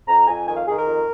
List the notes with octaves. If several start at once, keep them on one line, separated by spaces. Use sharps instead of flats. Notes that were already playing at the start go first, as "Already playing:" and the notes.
F2 A#5
F2 G#5
D#3 G#5
F5
D#3 G#4
A#4
F2